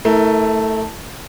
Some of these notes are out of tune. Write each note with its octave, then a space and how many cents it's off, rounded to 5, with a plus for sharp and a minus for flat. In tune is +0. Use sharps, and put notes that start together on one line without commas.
A3 +5 E4 -30 A#4 +0